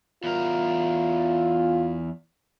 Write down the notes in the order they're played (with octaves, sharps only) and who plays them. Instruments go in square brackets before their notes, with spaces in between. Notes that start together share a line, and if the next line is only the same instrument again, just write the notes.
[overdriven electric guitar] E2 A#4 [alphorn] F4